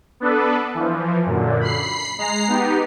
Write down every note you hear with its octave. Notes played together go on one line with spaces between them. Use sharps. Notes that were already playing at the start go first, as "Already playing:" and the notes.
B3 D4 A4 B4
E3 F3
F#2 A#2 D3
B5 C7
G#3 A#5 C7
B3 D#4 G4